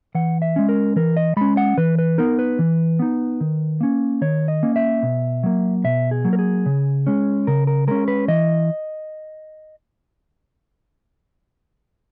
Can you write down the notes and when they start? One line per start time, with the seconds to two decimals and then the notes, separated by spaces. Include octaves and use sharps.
0.15 E3 F#5
0.42 E5
0.56 G#3 C#4
0.69 A#4
0.96 E3 A#4
1.17 D#5
1.37 G#3 C#4 B5
1.57 F#5
1.78 E3 B4
1.99 B4
2.18 B3 D#4 A#4
2.39 B4
2.59 E3
2.99 B3 D#4
3.41 D#3
3.81 A#3 C#4
4.21 D#3 C#5
4.48 D#5
4.63 A#3 C#4
4.76 E5
5.03 B2
5.43 F#3 A#3
5.84 B2 E5
6.11 G#4
6.25 F#3 A#3
6.33 A#4
6.39 G#4
6.66 C#3
7.07 G#3 C#4
7.47 C#3 A#4
7.67 A#4
7.87 G#3 C#4 A#4
8.08 B4
8.28 E3 D#5